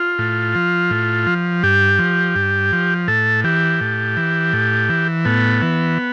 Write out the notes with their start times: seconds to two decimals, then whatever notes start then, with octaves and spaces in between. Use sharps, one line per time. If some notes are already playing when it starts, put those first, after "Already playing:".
Already playing: F4
0.19 A2
0.55 F3
0.90 A2
1.27 F3
1.63 G2 G4
1.99 F3
2.35 G2
2.72 F3
3.08 A2 A4
3.44 E3 G4
3.81 A2
4.17 E3
4.53 A2
4.89 E3
5.25 A2 B3
5.62 E3